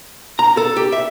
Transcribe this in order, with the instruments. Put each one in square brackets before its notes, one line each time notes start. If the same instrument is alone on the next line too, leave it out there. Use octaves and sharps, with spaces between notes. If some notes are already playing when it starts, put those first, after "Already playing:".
[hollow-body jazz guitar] A#5
A4
G4
E5